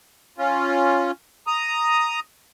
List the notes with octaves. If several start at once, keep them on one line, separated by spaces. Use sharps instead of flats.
C#4 F4
A#5 D#6